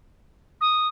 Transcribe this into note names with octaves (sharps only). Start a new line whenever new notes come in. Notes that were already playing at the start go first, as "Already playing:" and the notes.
D#6